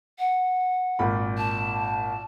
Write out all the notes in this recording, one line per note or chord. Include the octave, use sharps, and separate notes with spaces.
F#5
G#1 A#2 B5
A5